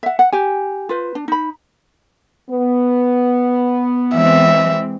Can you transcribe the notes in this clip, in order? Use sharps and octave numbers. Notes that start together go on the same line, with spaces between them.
E5 F#5
F#5
G4 G#5
F4 B4 C5
D4
D#4 B5
B3
E3 G#3 C4 E5